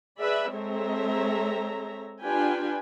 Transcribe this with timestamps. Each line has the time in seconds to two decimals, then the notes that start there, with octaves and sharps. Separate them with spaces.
0.20 G#4 B4 D5 E5 B5
0.52 G#3 C4 A4 C#5 E5 A#5
2.22 D4 F4 G4 B4 G5 G#5